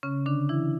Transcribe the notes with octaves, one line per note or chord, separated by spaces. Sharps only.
C#3 C#4
D3 D4
E3 E4